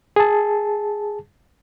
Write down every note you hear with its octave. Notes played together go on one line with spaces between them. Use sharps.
G#4 A5